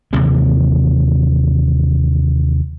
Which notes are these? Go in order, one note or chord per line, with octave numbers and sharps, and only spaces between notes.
D#2 C3 E3 G#3